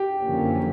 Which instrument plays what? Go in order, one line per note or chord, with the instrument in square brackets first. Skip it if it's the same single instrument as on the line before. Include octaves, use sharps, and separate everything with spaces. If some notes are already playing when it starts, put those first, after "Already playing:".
Already playing: [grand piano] G4
[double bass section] F#2 D3 F3 A#3 C#4